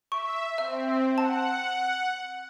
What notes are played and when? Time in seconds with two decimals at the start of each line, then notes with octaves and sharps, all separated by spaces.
0.12 E5 C#6
0.58 C4 E5
1.18 F#5 A5